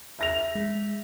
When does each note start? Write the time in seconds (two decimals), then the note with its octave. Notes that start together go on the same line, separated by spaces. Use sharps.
0.19 E5 A#6 F7
0.55 G#3